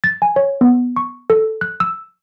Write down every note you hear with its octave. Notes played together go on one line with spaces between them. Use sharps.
A6
G#5
C#5
B3
C#6
A4
F#6
E6